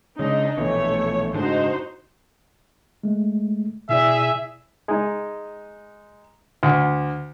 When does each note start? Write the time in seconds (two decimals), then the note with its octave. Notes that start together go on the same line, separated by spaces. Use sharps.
0.19 C#3 G#3 D4 D#4
0.57 A#1 B2 E3 A3 C#5
1.33 F#1 G#2 D4 D#4 F#4 C5
3.03 G#3 A3
3.89 B2 E4 G#4 D5 E5
4.88 G#3 D#4
6.63 D2